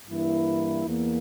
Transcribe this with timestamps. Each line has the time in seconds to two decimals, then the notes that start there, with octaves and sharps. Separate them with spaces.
0.08 G2 E3 A#3 E4
0.86 E2 E3 A#3